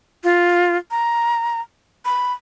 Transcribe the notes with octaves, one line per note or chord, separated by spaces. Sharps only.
F4
A#5
B5